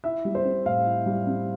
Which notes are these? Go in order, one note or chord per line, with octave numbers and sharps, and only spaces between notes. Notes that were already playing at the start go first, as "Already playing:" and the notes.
E4 E5
G3
C5
C4
A2 F5
E4
G3
C4